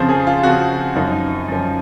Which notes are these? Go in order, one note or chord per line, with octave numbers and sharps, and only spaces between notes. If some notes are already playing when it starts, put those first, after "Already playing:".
Already playing: F2 C#3 F3 C5
G#4
F4
F2 C#3 F3 F#4
F#2 F3 D#4
F#2 F3